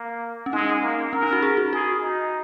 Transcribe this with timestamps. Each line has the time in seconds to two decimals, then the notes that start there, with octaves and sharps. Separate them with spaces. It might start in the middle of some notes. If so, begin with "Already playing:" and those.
Already playing: A#3
0.46 C#4
0.53 G#3 D#4
0.83 A#3
1.13 C#4 A#4
1.23 D#4
1.33 F#4
1.42 G#4
1.57 F#4
1.73 F#4 G#4
2.02 D#4